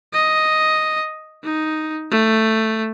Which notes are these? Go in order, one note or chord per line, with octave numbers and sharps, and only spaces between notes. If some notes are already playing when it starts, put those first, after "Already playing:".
D#5
D#4
A3